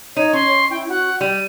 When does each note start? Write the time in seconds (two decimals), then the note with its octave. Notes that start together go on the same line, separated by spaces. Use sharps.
0.17 D#4 C#5 D#7
0.33 C#4 C6
0.70 E4 G5
0.89 F#4 F#5
1.21 G3 D5 D#7